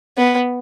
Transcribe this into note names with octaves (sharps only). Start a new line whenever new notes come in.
B3